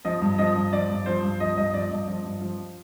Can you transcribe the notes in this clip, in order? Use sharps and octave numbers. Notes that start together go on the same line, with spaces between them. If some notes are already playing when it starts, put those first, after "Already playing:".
F3 D#5
G2
F3 D#5
G2
F3 D5
G2
F3 C5
G2
F3 D#5
G2 D#5
F3 D5
G2 D#5
F3
G2
F3